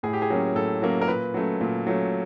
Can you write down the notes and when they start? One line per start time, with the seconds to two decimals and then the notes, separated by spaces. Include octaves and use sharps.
0.03 A2 G#4
0.13 G4
0.22 G#4
0.30 F#3 A#3 C#4
0.55 A2 A4
0.82 F#3 A#3 C#4
1.01 A#4
1.08 A#2 B4
1.34 F#3 A3 C#4
1.61 A#2
1.87 F#3 A3 C#4